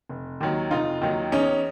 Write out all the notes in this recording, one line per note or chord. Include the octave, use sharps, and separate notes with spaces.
F1
D#2 D#3 F#3
F1 D#4 F4
D#2 D#3 F#3
E2 C#4 D#4